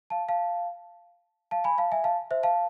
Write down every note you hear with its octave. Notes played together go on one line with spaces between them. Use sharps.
F5 A5
F5 A5
F5 A5
G#5 B5
F5 A5
E5 G#5
F5 A5
C5 E5
F5 A5